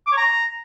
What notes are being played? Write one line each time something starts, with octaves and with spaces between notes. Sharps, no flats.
D6
C#5
A#5